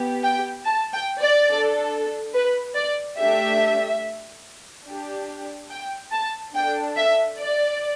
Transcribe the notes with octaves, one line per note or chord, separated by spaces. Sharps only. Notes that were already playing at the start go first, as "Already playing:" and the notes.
Already playing: B3 G4
G5
A5
G5
D5
D4 A4
B4
D5
A3 D4 G4 E5
D4 G4
G5
A5
D4 A4 G5
E5
D5